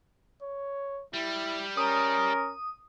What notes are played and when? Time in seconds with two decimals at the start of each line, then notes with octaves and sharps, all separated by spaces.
0.42 C#5
1.13 G3 E4
1.77 C#4 A#4 D#6